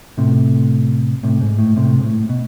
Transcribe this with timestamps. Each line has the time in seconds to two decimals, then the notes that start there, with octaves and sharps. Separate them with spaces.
0.18 A2 C3
1.23 A2 C3
1.41 G#2
1.58 A2
1.76 A2 C3
1.99 G#2
2.03 A2
2.29 B2